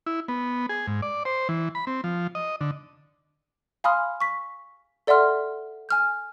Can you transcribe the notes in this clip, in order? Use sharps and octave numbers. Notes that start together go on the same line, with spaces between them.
E4
B3
G#4
G#2
D5
C5
E3
B5
C4
F3
D#5
D3
F5 G#5 B5 C6 D#6 F6
C#6 B6
A4 D5 E5 F#5 C6 F6
G#5 F6 G6